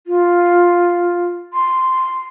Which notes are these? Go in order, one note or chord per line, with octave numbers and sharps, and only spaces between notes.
F4
C6